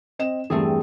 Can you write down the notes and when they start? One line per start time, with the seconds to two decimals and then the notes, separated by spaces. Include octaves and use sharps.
0.19 C4 D#5 E7
0.50 E2 G2 A3 C4 G#4